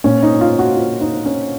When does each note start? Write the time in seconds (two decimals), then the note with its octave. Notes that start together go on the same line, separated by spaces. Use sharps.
0.04 A#2 C#4
0.23 D#4
0.41 F4
0.59 F#4
0.76 F4
1.01 D#4
1.26 C#4